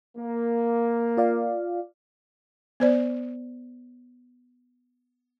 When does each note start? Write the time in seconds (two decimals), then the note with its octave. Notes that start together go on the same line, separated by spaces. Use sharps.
0.17 A#3
1.17 F4 D5 F5
2.80 B3 C5 D5